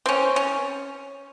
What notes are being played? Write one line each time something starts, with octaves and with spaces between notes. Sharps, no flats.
C4 C#4
C#4